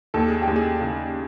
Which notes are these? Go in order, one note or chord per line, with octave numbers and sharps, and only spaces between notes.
D#2 A4
G#4
G4
D#2
G#4
C#3